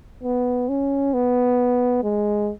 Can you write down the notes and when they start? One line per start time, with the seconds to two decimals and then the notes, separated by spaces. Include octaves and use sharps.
0.23 B3
0.69 C#4
1.14 B3
2.04 G#3